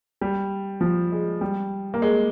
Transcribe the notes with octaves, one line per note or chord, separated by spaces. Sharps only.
G3
F3
G#3
G3
A#3
G#3